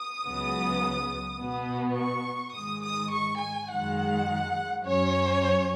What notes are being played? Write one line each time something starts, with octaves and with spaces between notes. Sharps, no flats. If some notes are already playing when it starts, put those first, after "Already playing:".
Already playing: D#6
C#2 C#3 F#3 B3
B2 B3
C#6
G#2 D#3 G#3 D#6
D#6
C#6
G#5
F#2 D#3 G#3 F#5
F#2 F#3 C#4 C#5